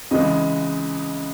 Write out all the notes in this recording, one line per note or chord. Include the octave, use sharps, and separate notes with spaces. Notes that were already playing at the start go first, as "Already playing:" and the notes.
C#2 C#3 E3 G#3 D#5